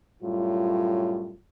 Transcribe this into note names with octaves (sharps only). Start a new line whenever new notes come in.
F#2 A2 G3 F4